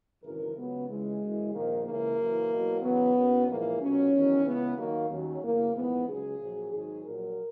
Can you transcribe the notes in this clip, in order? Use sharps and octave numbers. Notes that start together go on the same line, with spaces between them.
G#1 F#2 C#3 E3 A#4
C#2 C#3 F#3 B3
C#2 C#3 E3 G#3
F#1 F#2 E3
A#1 G#2 D#3 A#3
C#2 C#3 E3 A#3
F#1 F#2 E3
E2 B2 F#3
E2 C#3 F#3 B3
F#1 F#2 C#3
A#1 G#2 E3 A#3
B1 A#2 F#3 C#4
E2 D#3 F#3
C#2 C#3 E3 B3
D#2 D#3 F#3 A#3
D#2 C#3 F#3
F#1 E2 C#3 A#3
A#1 G#2 E3 B3
C#2 C#3 F#3 G#4
A#1 A#2 F#3
G#1 G#2 F#3 G#4
A#1 A#2 F#3 A#4